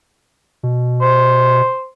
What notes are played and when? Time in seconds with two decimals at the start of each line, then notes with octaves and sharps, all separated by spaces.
0.63 B2
1.02 C5